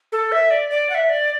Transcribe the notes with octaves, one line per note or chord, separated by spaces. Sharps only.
A4
E5
D5
D5
F#5
E5
D5